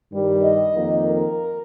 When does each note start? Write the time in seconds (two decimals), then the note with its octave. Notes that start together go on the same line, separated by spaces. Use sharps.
0.11 G2 D#3 G3
0.42 D#5
0.74 F2 D#3 A#3
1.05 A#4